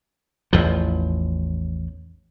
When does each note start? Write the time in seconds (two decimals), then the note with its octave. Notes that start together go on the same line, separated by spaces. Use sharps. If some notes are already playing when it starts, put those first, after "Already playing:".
0.53 A1 E2 F3